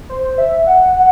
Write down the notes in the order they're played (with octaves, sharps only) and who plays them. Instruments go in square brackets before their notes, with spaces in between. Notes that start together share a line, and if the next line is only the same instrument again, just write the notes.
[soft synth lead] C5
E5
F#5
F#5